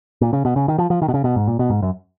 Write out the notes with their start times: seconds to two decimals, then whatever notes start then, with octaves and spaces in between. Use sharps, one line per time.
0.21 A#2
0.33 C#3
0.45 B2
0.56 C#3
0.68 D#3
0.78 F3
0.90 F3
1.02 D#3
1.08 B2
1.14 C#3
1.24 B2
1.36 G#2
1.48 A#2
1.59 B2
1.70 G#2
1.82 F#2